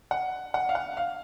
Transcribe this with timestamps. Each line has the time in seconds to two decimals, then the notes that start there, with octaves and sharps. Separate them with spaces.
0.11 F#5
0.54 F#5
0.69 F5
0.75 F#5
0.97 F5